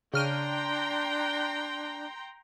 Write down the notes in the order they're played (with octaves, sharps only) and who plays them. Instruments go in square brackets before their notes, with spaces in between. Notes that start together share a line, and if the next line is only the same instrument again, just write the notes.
[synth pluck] C#3 F6 D#7 [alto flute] D4 [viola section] G5 A#5 C6